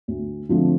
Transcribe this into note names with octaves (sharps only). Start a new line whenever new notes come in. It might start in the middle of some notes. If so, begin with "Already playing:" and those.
D2
D3 F3 A3 C4